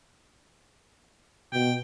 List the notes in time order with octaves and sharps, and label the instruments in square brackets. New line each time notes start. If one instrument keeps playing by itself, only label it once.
[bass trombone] B2 [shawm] G5